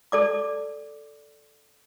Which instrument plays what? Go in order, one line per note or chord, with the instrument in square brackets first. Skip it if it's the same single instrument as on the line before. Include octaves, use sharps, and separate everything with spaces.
[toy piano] A4 D5 D6